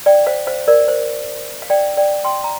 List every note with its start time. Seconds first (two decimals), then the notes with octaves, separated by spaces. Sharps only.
0.06 D5 G5
0.27 C5 F5
0.47 C5 F5
0.68 A#4 D5
0.88 C5
1.62 F5
1.70 D5 G5
1.97 D5 G5
2.25 G5 C6
2.44 A#5